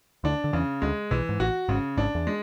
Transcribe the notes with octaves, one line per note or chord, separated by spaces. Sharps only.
D2 D3 D4
D3
E2 C#3 E3
D2 D3 G#3
B1 B2 E3
G#2
A1 A2 F#4
G#1 G#2 C#3
G#1 G#2 D4
E2
G#3